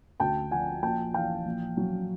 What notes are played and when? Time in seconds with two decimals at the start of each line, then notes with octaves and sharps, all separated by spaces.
0.20 D2 G5 A5
0.51 F3 F#5 G#5
0.83 A#1 G5 A5
1.14 E3 F5 G5
1.46 A#1
1.77 F#3